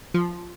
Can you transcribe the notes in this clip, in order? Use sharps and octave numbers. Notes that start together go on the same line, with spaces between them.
F3